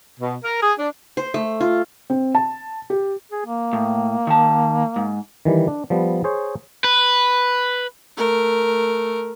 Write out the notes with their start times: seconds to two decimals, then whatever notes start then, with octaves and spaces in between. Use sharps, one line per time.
0.19 B2
0.43 A#4
0.62 G#4
0.78 D4
1.17 C5
1.34 A3
1.61 F4
2.10 C4
2.35 A5
2.90 G4
3.31 G#4
3.46 A#3
3.73 A2
4.27 D#3 A5
4.96 G#2
5.45 D#3 E3 G3
5.68 D4
5.90 F3 G3 B3
6.24 G#4 C5 C#5
6.84 B4
8.17 A3 A#4